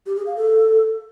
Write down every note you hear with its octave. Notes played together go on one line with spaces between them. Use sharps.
G4
G#4
F5
A4